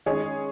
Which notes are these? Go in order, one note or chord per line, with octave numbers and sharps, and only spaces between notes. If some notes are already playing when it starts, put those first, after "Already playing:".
D#3 G#3 C#4 G#4 C#5